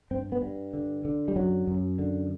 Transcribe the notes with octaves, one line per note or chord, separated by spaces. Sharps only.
G2 C4
B3
G2
D3
D3
G3
F#2 F#3
F#2
D3